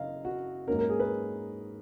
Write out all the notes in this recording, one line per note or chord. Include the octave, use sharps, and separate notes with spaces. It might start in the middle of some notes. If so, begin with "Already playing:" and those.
Already playing: F#1 F#2 D#5 F5
F#4
G#2 F#3 A#3 C#4 A#4
A#4
G#4
B4